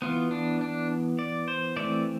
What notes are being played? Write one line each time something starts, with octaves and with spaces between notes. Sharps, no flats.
E3 B3 F4
D4
D4
D5
C5
E3 A3 C4 D5